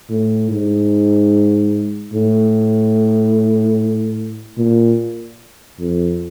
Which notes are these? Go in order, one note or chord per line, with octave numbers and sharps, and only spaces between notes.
A2
G#2
A2
A#2
F2